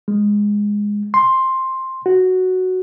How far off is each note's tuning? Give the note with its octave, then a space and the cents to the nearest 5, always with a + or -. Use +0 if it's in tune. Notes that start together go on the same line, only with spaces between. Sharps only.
G#3 -10
C6 +10
F#4 +0